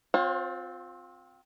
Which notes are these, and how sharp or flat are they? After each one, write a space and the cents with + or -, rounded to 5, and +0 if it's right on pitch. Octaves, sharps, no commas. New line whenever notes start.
C4 -5 F4 +30 C#5 -45